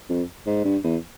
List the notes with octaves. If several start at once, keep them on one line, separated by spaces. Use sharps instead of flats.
F2
G#2
G2
E2